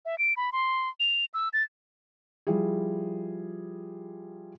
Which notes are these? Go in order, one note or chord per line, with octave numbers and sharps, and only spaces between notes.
E5
D7
B5
C6
F7
E6
A6
F3 G3 E4 G#4